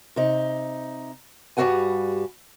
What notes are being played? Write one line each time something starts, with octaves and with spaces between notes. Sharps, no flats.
C3 D#4
G2 G3 F#4 A4 F#5 G#5